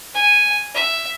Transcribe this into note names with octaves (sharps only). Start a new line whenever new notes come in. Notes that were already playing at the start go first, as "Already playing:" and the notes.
G#5
E5